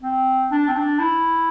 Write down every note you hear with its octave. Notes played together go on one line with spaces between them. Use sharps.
C4
D4
C4
D4
E4